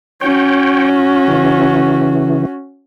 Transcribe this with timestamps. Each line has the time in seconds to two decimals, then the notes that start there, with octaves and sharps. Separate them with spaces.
0.21 C#4 F#4 C#5 G5
1.28 C#3 E3